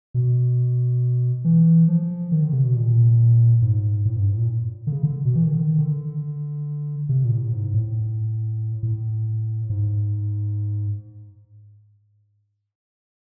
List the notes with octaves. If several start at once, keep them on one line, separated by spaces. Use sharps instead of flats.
B2
E3
F3
D#3
D3
C3
B2
A#2
G#2
A2
G2
A2
A#2
D3
C#3
D3
B2
E3
D#3
D3
D#3
D3
C3
A#2
A2
G#2
A2
A2
G#2